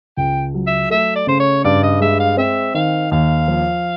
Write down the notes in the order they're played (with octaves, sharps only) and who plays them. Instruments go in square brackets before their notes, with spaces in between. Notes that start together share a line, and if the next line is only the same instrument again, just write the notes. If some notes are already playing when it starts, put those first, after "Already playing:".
[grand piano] C#2 [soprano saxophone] G5
[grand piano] F#3
[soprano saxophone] E5
[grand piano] A3 [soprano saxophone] E5
[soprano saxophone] D5
[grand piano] C#3 [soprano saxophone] C5
[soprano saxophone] C#5
[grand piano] G2 [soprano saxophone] D5
[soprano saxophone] D#5
[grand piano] G#3 [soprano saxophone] E5
[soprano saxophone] F5
[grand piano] C4 [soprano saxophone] E5
[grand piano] D#3 [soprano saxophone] F5
[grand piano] D#2 [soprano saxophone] F5
[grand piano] F3